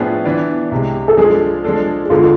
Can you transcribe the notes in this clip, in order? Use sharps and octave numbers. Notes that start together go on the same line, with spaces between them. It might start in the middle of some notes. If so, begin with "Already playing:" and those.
Already playing: A2 F3 B3 D4 G#4
E3 B3 D4
C2 C3 G#3
A4
F3 G#3 D4 G#4
F3 G#3 D4 A4
G#4
E2 D3 G#3 F4 A4